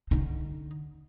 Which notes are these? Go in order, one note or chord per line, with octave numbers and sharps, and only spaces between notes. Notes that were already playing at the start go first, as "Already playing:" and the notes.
D3 D#4